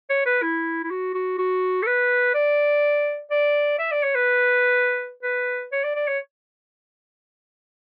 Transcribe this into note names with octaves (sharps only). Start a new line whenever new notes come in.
C#5
B4
E4
E4
F#4
F#4
F#4
A4
B4
D5
D5
E5
D5
C#5
B4
B4
C#5
D5
D5
C#5